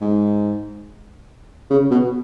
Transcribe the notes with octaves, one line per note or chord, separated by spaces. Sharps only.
G#2
C#3
B2